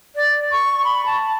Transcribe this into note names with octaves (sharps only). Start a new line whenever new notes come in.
D5
C#6
B5
A5